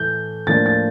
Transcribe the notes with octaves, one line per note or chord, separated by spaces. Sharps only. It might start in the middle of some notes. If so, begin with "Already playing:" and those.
Already playing: A2 E3 A3 G6
A2 F3 A#3 D4 A6
A6